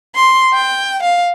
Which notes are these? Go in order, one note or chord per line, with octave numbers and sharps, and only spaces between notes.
C6
G5
F5